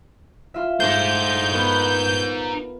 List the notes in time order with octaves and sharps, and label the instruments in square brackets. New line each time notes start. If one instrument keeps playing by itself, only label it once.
[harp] F4 E5
[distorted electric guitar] D#4 C5 [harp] A4 D6 [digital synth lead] G6
[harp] B3 A#4 B4